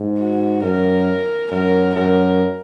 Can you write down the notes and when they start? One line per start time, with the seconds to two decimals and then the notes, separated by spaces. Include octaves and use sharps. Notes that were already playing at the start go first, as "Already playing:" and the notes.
Already playing: G#2
0.19 F#4
0.63 F#2 A#4
1.51 F#2 A#4
1.95 F#2 A#4